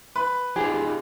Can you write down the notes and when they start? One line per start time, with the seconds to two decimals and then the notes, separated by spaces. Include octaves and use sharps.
0.16 B4
0.56 D#4 F4 G4 G#4